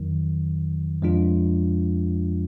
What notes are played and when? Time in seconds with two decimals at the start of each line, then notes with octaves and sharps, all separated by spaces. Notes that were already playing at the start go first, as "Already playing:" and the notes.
Already playing: F2 D#3 F#3
1.02 F2 F3 G#3 D4 F4